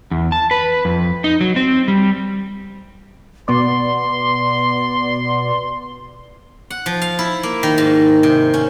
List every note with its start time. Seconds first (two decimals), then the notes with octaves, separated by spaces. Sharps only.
0.11 E2
0.32 A5
0.51 B4
0.85 F2
1.24 D#4
1.41 F#3
1.56 C4
1.88 G3
3.48 B2 B3 D5 C6
6.70 F#5
6.86 F3
7.02 F5
7.19 E4
7.43 A#3
7.63 D#3
7.78 G#2
8.23 C3
8.54 C#4